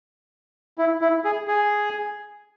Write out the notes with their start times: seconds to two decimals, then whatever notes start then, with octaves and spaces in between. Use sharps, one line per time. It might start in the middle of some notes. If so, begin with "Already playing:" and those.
0.78 E4
1.01 E4
1.24 G#4
1.48 G#4